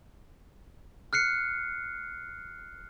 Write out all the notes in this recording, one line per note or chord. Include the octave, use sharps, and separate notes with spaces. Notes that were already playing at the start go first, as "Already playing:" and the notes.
F6 F#6 C7 C#7